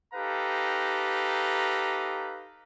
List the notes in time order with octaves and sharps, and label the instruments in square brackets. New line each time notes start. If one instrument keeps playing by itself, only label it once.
[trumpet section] D#4 G4 A4 B4 F5 A#5